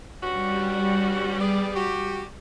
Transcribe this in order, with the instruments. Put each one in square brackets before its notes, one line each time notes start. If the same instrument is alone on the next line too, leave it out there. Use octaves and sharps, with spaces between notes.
[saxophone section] G2 C#4 F#4 [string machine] G3
[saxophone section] B3 G#4 D5
F#4 G4